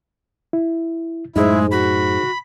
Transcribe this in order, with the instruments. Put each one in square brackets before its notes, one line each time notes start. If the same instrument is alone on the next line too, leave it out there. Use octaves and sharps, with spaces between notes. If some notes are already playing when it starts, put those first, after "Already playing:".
[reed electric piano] E4
[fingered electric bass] F#2 A2 [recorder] G#3 [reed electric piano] D#4 G#4 C5 [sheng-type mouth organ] E4
[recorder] F#4 [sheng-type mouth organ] B5